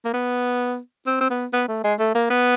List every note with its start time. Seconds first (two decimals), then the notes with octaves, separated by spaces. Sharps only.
0.05 A#3
0.14 B3
1.07 C4
1.21 C4
1.30 B3
1.53 B3
1.68 A3
1.84 G#3
1.99 A3
2.15 A#3
2.30 B3